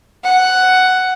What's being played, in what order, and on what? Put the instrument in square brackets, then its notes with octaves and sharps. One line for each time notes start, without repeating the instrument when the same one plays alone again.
[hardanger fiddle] F#5